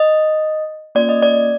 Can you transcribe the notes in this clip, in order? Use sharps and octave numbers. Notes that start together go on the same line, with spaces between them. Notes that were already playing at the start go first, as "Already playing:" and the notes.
Already playing: D#5
A#3 C#4 F4 D5
D#5
D5